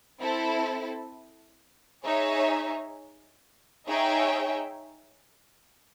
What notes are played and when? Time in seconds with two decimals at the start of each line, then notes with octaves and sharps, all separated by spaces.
0.21 C4 E4 A4
2.04 D#4 G#4 C#5 E5
3.88 D#4 G#4 C#5 E5 G5